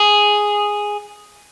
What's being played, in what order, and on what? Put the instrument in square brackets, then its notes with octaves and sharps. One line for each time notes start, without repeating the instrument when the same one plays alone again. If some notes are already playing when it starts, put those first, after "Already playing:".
Already playing: [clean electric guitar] G#4